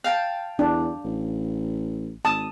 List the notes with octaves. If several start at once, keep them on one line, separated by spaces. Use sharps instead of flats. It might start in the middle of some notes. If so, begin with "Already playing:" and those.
F5 G5 A5
E2 D4
A1
G#1 A5 D#6